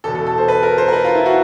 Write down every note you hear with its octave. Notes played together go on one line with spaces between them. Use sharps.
E2 B2 A4
A4
A4
C5
B4
A#4
C5
A#4
B4
F4
E4
F#4